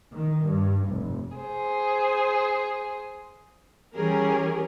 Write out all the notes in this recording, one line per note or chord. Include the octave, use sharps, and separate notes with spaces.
D#3
G2
F1
G#4 C5
E3 G3 C#4 G4 G#4 A#4